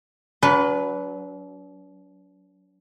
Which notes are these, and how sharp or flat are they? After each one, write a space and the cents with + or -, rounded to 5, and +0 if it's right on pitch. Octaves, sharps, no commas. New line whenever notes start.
F#3 +0 D4 -45 B4 +0